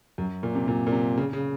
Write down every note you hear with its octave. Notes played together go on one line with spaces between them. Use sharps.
F#2
A#2
C3
A#2
A#2
C3
C#3
C#3